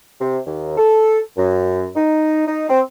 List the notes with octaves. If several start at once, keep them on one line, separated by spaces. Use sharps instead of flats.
C3
D#2
A4
F#2
D#4
D#4
C4